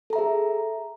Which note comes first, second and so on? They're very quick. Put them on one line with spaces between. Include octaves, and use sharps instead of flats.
A4 A#5 E5 G#4